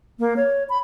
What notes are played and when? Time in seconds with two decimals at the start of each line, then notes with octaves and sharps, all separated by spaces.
0.19 A#3
0.36 C#5
0.69 B5